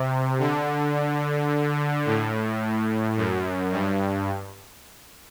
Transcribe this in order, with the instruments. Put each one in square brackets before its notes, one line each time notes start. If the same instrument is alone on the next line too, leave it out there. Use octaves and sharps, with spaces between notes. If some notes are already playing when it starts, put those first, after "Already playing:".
Already playing: [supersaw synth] C3
D3
A2
F#2
G2